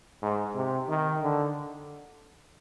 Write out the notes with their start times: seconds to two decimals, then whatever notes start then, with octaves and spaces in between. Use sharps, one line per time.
0.22 G#2
0.55 C3
0.89 D#3
1.22 D3